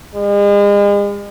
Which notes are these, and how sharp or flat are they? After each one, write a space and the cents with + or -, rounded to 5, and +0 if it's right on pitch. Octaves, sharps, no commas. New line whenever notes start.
G#3 -40